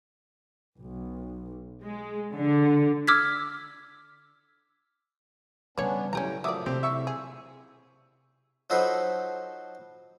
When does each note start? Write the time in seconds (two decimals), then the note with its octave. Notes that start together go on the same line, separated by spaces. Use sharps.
0.80 B1
1.84 G#3
2.32 D3
3.07 D6 E6 F6 G#6 B6
5.78 C#3 G3 B3 C#4 D4 C#5 D5
6.13 F#2 A2 C#3 C#4 G4 G5 A#5
6.44 F3 F#3 A3 A#3 D5 E5 D6 D#6
6.66 C3 A3 C4 G4
6.83 A2 E5 C#6 E6
7.07 G#4
8.70 F3 F#3 D#4 A4 B4 C5